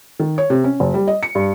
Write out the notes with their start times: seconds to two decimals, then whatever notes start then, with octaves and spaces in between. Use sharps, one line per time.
0.20 D#3
0.38 C#5
0.50 C3
0.64 C#4
0.80 F#1
0.94 G3
1.07 D#5
1.23 C#7
1.35 G2